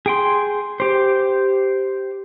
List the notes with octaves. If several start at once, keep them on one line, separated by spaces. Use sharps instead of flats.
G#4 G5 C6
G4 C5